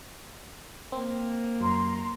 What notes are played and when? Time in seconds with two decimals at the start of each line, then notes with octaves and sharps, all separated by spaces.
0.92 A#3 C4
1.60 F#2 A#5 C6